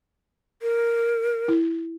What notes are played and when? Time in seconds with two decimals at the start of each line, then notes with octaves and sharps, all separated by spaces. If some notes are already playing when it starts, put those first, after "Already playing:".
0.62 A#4
1.48 E4